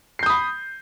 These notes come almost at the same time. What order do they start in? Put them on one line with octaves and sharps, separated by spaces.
C7 G6 D#6 B5